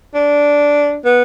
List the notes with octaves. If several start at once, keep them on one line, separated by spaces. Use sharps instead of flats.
D4
B3